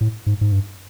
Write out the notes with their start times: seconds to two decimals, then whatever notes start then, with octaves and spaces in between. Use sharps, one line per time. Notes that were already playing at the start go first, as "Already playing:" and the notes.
0.01 A2
0.26 G#2
0.41 G#2
0.52 G2